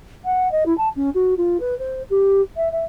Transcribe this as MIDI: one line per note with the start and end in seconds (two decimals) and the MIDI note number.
0.25 0.51 78
0.52 0.64 75
0.66 0.76 64
0.78 0.89 81
0.96 1.10 61
1.14 1.34 66
1.37 1.57 65
1.60 1.77 71
1.79 2.03 72
2.10 2.41 67
2.57 2.71 76
2.72 2.85 76